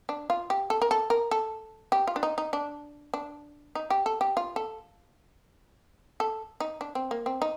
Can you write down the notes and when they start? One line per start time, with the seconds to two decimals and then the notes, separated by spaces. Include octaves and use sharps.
0.09 D4
0.30 F4
0.50 G4
0.70 A4
0.82 A#4
0.91 A4
1.10 A#4
1.31 A4
1.92 G4
2.07 F4
2.16 D4
2.23 D#4
2.38 D#4
2.53 D4
3.14 D4
3.75 D#4
3.90 G4
4.06 A4
4.21 G4
4.37 F4
4.56 A4
6.20 A4
6.60 D#4
6.81 D4
6.95 C4
7.11 A#3
7.26 C4
7.42 D#4